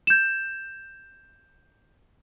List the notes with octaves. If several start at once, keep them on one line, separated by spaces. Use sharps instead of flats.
G6 E7